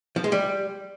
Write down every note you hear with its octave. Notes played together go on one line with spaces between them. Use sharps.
F3
G#3
G3